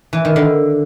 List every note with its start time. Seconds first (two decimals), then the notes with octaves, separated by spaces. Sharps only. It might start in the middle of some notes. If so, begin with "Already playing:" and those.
0.13 E3
0.25 D#3
0.36 D3